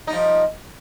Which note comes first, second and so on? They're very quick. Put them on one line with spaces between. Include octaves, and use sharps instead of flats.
D#4 G3 F3